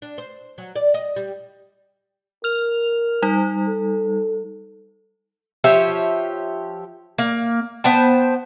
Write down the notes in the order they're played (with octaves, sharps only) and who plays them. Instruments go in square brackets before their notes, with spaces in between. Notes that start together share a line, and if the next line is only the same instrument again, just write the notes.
[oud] D4
C5
F#3
D5
D#5
G3
[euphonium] A#4 [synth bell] F6 F7
[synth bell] G3 D#4
[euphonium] A4
[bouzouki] F3 G4 C#5 E5
A#3
B3 C5 G5 A5